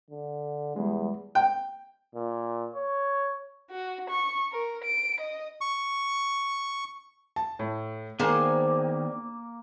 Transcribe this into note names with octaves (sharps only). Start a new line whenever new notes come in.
D3
E2 G3 G#3
G5
A#2
C#5
F#4
C#6
A#4
D7
D#5
C#6
A5
A2
D#3 A#3 B3 D4 G#4 C5 G#5